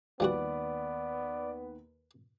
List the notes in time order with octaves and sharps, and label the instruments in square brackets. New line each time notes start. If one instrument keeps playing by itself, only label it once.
[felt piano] D#2 B4 [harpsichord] F3 G3 F#4 [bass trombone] B3 [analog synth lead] D5